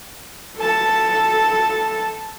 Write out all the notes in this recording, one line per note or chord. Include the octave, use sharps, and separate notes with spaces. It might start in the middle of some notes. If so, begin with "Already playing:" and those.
A4 A5